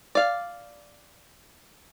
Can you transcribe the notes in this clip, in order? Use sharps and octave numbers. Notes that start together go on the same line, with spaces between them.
D5 F5